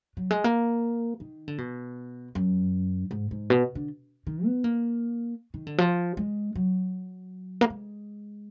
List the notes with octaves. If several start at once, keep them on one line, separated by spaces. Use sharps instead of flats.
F#3
G#3
A#3
D#3
D3
B2
F#2
G#2
G#2
B2
D3
D#3
B3
A#3
D#3
D3
F3
G#3
F#3
A#3
G#3